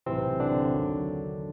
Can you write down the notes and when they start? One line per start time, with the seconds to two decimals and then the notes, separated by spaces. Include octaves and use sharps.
0.06 B1 A2 C3 E3 C4
0.40 D3 D4
0.73 D#2 D#3 F#3